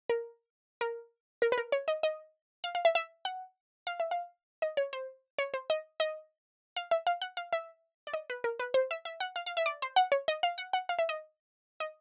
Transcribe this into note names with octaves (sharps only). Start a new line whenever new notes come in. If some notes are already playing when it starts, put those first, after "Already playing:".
A#4
A#4
A#4
B4
A#4
C#5
D#5
D#5
F5
F5
E5
E5
F#5
F5
E5
F5
D#5
C#5
C5
C#5
C5
D#5
D#5
F5
E5
F5
F#5
F5
E5
D5
D#5
B4
A#4
B4
C5
E5
E5
F#5
F5
F5
E5
D5
C5
F#5
C#5
D#5
F5
F#5
F#5
F5
E5
D#5
D#5